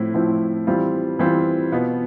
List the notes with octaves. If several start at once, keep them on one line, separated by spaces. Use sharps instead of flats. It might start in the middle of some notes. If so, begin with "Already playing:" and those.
Already playing: A2 F3 C4 E4
A2 F3 C4 E4
E3 G3 C4 F4
E3 G3 C4 F4
B2 B3 F4